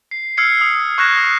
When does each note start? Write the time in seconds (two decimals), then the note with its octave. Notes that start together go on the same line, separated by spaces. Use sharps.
0.11 C7
0.37 E6 F6 G#6 C7 C#7
0.61 D#6
0.98 C#6 F6 F#6 G#6 A#6 E7
1.17 D#6 F#6